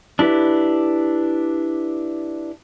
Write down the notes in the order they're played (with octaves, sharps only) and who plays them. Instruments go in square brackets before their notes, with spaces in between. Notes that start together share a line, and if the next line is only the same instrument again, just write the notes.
[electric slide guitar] D4 E4 G4 B4